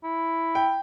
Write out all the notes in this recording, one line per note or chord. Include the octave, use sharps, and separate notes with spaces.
E4
G5